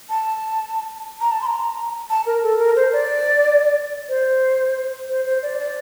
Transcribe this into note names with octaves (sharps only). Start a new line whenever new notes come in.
A5
A#5
A5
C6
A#5
A5
A#4
A4
A#4
C5
D5
C5
C5
C5
D5
D5